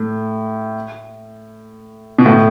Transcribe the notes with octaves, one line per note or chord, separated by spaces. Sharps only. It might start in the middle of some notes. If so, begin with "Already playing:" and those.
Already playing: A2
B2
A2